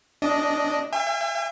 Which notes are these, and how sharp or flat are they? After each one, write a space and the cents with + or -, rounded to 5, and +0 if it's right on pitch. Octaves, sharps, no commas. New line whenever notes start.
D4 -10 D#5 +0
E5 +40 G#5 -45